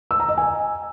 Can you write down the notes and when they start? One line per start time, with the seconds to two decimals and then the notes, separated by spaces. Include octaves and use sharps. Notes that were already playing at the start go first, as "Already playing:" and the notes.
0.11 E6
0.20 A#5
0.29 D#5
0.38 G#5